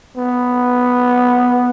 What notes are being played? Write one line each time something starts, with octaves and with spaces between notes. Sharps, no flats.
B3